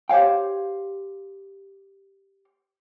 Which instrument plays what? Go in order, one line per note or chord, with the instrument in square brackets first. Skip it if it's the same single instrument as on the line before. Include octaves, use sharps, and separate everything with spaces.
[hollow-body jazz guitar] G4 C5 C#5 F5 G5